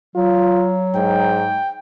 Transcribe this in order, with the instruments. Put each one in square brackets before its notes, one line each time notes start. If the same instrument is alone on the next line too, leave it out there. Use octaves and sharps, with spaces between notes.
[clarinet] F#3 [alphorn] F4
[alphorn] G#2 [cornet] G5